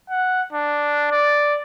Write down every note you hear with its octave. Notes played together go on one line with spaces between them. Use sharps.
F#5
D4
D5